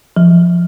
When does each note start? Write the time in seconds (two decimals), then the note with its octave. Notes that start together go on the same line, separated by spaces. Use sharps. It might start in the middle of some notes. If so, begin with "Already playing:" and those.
0.17 F3